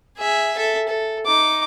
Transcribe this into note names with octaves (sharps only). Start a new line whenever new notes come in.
G#4 E5
A4 E5
A4
D#4 D6